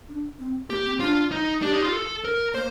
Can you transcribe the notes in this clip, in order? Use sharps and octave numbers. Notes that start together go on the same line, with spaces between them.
D4
C4
A#3 G4
C4
D4 F4
D#4
D4 G4
D#4
F4
A4
A#4
A#3 C5